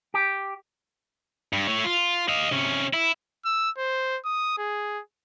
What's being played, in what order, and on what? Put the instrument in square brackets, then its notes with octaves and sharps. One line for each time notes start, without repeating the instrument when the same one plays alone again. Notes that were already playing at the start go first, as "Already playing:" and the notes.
[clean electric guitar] G4
[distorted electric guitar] G2
A3 C#5
F4
D#5 F5
C3 C#4
E4
[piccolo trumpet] E6
C5
D#6
G#4